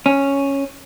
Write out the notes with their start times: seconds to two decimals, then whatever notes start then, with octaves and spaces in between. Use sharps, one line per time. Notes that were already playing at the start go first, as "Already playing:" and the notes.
0.06 C#4